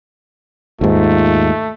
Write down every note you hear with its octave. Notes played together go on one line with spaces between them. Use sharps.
D#2 G#2 A3 F4